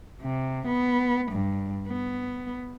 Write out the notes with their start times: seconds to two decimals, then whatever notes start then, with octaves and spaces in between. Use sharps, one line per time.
0.21 C3
0.66 B3
1.31 G2
1.88 B3